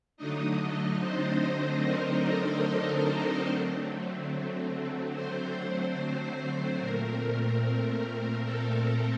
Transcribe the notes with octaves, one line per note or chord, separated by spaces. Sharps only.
D3 F#3 A3 D4 D#4 D#5
C4 C5
A#4
A4
A#4
D3 F#3 A3 C4
C4 C5
A#2 A3 C4 A#4
A4